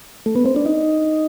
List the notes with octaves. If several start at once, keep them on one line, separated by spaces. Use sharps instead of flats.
A3
B3
C4
D4
D#4